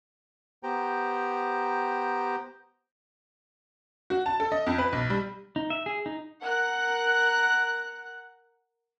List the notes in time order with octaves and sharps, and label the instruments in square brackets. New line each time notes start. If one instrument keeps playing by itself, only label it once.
[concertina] B3 G4 C5 G5 A#5
[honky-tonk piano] F#4
A5
A4
D#5
F2
B4
B1
G3
[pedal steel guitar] D#4
E5
G#4
D#4
[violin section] A#4 F#5 F#6